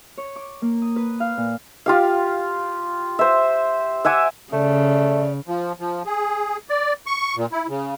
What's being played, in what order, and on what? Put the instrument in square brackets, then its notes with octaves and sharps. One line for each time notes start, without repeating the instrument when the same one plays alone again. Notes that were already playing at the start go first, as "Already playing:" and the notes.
[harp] C#5
D6
A#3
D#6
B4
F5
A#2
[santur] F4 G4 F5
C5 E5
E5 F#5 G#5 D6
[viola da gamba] C#3 [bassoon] A3 [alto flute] D5
[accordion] F3
F3
G#4
D5
C#6
A#2
E4
C#3